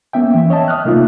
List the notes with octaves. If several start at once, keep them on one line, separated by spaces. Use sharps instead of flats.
A#3 B3 C#4 E5 G5
E3 E5
C#5 D#5 E5 A5
D#6 F6 F#6
C3 A3 A#3 D#4 F4 E5